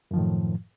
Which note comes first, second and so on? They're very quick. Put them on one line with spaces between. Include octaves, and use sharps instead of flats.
F#2 F3 D#3 A2